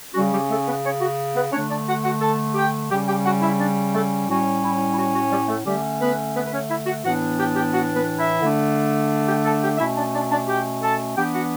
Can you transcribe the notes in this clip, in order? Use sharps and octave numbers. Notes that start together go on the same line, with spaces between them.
C#3 G3 C#4 F#4
G3 G4
A3 A4
B3 B4
C#4 C#5
F#4
B3 B4
D3 A3 C#4 D4 C#5
D4 D5
F#4 F#5
F#4 F#5
A4 A5
G4 G5
C#3 G3 C#4 G4 G5
G4 G5
F#4 F#5
E4 E5
D4 D5
A3 A4
A2 G3 C#4 F#4
E4
E4
F#4
F#4
G3 G4
A3 A4
D3 G3 A3 C#4 G4
B3 B4
B3 B4
B4
C#4 C#5
E4 E5
F#4 F#5
A2 E3 B3 D4 F#4 F#5
G4 G5
G4 G5
F#4 F#5
B3 B4
E4 E5
D3 A3 D4
G4 G5
A4 A5
G4 G5
B2 A3 C#4 E4 E5
D4 D5
D4 D5
D4 D5
G4 G5
A4 A5
E3 B3 D4 G4 G5
F#4 F#5